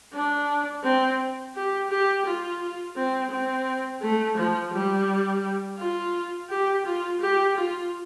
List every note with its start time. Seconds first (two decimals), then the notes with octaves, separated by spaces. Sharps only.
0.13 D4
0.83 C4
1.55 G4
1.89 G4
2.25 F4
2.96 C4
3.31 C4
4.02 A3
4.37 F3
4.73 G3
5.78 F4
6.50 G4
6.85 F4
7.21 G4
7.56 F4